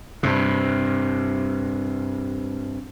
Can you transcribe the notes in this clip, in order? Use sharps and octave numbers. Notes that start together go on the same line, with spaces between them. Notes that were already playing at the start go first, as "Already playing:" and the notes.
G2 C3